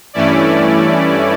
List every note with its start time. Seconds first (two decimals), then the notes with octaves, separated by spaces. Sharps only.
0.13 G2 E3 A3 C#4 E4 D5